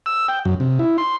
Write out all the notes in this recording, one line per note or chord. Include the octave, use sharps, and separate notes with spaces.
E6
G5
F#2
C3
E4
C6